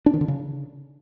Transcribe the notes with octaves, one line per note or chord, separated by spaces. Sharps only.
D4
D#3
D3
C#3